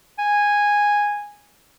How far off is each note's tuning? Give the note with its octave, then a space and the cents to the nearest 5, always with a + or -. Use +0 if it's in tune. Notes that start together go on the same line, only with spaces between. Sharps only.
G#5 -10